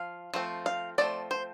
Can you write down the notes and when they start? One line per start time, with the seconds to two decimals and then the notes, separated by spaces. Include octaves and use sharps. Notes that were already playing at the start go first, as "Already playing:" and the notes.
Already playing: F3 F5
0.34 F3 A3 C4
0.66 F5
0.98 F3 A3 C4 D5
1.31 C5